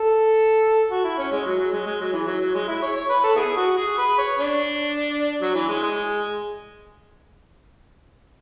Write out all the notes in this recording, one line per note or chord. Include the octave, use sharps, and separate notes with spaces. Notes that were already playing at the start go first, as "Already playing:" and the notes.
Already playing: A4
F#4
E4
C#4
G#3
F#3
F#3
G#3
G#3
F#3
E3
F#3
F#3
G#3
E4
C#5
C#5
B4
A4
B3 E4 G#4
F#4
G#4
B4
C#5
D4
F#3
E3
G#3
G#3